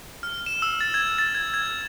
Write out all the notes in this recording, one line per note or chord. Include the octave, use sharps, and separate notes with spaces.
F6
E7
E6
A6
G#6
A6
G#6
G#6